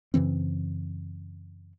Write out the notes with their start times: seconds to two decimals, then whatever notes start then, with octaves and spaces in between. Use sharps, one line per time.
0.14 F#2 C#3 E3 C4